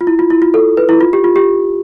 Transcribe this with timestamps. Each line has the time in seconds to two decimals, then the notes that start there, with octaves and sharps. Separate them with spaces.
0.01 F4
0.07 E4
0.19 F4
0.30 E4
0.42 F4
0.54 A4
0.77 B4
0.89 E4
1.01 F4
1.13 G4
1.24 F4
1.36 G4